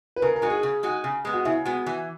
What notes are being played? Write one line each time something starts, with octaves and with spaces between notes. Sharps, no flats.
B4
C#3 A#4
A#4
G#3 D#4 F#4
G#4
C#3
G#3 D#4 F#4
C#3
G#3 B3
F#4
C#3 E4
G#3 B3 F#4
E3